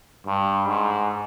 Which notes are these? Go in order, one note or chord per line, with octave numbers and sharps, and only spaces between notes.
G2
G#2